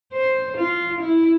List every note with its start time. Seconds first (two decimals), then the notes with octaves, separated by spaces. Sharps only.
0.13 C5
0.57 F4
1.00 E4